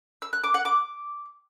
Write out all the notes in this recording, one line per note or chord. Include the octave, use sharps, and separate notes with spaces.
E6
F#6
D6
F#5
D6